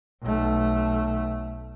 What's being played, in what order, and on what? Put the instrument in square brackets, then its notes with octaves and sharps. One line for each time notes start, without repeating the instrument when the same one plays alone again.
[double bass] B1 A3